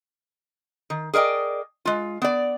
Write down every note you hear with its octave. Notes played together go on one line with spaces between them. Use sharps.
D#3
G#4 A#4 D5 D#5 G5
G#3 F4
B3 D5